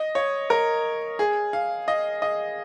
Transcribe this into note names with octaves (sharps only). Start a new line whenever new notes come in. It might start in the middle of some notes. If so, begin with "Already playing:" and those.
Already playing: D#5
C#5
A#4
G#4
F5
D#5
D#5